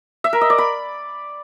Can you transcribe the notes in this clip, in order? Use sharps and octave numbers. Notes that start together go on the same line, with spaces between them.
E5
A#4
D#5
D5
B5